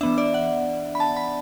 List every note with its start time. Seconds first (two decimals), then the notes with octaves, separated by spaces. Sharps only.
0.01 E3 B3 D4 E5
0.18 D5
0.34 F#5
0.95 B5
1.00 A5
1.17 B5